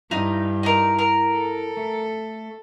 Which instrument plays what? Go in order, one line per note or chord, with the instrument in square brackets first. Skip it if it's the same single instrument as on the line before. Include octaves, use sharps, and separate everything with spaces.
[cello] G2 [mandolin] D#4 [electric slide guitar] E4 F5
[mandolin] D#4 A#4
A#4
[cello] A4
[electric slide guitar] A3